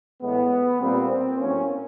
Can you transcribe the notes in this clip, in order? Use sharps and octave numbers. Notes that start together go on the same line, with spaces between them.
A2 E3 G#3 B3
A#2 G3 A#3 C4
C4
A2 F#3 A#3 C#4